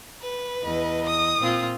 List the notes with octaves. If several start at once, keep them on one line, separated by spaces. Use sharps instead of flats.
B4
E2 D#5
D#6
A#2 C4 F4